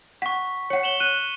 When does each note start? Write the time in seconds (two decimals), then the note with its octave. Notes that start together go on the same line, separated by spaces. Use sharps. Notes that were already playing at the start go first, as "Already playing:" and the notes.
0.22 F#5 C#6 B6
0.70 C#5 F#5 C#7
0.83 E7 F#7 G7
1.00 F#6 D#7